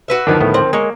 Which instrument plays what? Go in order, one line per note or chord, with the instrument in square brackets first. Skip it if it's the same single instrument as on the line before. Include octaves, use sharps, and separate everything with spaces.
[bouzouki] F#4 B4 E5 [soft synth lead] E6
[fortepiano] D2 D#3 F3 [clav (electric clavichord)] D4 [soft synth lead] A#4
[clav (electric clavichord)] A2 B3
[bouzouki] C4
[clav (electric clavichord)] G#3 C#5 [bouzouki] A#3